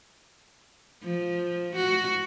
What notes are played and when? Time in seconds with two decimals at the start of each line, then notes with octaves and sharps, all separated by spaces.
1.03 F3
1.75 F#4